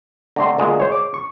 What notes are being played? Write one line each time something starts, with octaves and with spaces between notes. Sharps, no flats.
D3 A3 C4 A#5 C6
D2 A#2 G#3
G#3 C5 C#5
D6
C#6